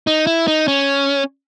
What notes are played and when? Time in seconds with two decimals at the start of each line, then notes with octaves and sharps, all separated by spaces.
0.07 D#4
0.27 E4
0.48 D#4
0.68 C#4